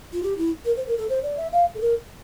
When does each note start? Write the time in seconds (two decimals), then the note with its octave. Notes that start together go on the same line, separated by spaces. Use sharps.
0.13 F4
0.23 G4
0.38 E4
0.65 A#4
0.76 C5
0.87 A#4
0.97 A4
1.09 C5
1.23 D5
1.37 E5
1.52 F5
1.75 A4
1.81 A#4